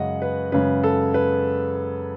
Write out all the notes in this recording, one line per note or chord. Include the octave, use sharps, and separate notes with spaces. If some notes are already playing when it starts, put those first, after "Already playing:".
Already playing: F#2 C#3 G#3 D#5 F#5
B4
F#2 C#3 G#3 B4
A4
B4